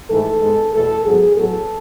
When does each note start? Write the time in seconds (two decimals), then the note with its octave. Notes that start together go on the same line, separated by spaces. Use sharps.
0.10 G#2 E3 A3 A4
0.42 G#2 G#3 B3
0.74 E2 B2 A3 A4
1.05 G#2 F#3 B3 G#4
1.37 A2 F#3 B3 A4